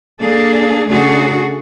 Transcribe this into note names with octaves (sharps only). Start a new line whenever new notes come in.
A#3 D4 G#4 A4
C#3 A3 D4 F#4 G#4 A4